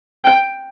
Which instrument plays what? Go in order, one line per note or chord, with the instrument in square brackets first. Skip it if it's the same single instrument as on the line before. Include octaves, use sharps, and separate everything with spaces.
[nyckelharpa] G5